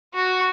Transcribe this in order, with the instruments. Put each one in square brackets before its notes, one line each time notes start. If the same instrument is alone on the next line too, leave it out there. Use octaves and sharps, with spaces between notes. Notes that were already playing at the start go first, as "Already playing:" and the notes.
[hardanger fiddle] F#4